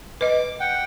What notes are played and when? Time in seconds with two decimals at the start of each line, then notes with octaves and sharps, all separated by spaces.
0.21 B4 D#5 D6
0.60 F#5 G5